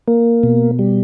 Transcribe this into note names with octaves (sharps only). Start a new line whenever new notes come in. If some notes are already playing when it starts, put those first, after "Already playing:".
A#3
B2
G3